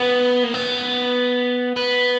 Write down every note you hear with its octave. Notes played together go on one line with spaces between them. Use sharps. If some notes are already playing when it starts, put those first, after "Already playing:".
Already playing: B3
A#3
B3
B3